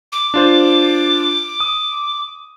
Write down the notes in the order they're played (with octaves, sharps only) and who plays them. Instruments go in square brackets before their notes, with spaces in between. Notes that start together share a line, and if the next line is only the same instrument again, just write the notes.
[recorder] D6
[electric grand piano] D4 F4 C5
D#6